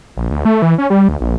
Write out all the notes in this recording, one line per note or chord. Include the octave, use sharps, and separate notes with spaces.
A#1
D2
A3
E3
C#4
G3
D2
A#1